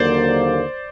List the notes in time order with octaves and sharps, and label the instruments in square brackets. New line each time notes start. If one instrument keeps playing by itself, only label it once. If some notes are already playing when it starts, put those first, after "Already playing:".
Already playing: [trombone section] D#2 D3 F#3 A#3 [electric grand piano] C5 D5